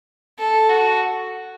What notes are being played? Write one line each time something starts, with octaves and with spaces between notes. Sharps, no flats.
A4
F#4